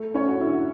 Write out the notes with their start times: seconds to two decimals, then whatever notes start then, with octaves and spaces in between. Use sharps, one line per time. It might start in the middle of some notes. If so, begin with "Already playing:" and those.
Already playing: A3
0.14 C#4 C#5
0.28 F#4
0.41 D3 E4